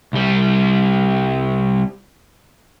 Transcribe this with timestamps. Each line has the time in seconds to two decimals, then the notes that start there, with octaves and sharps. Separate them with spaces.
0.13 C2 G3